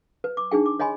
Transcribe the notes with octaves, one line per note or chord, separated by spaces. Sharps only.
B4
D6
D4 D#4 G#4 G5
D6
C#5 D#5 G#5 B5 C6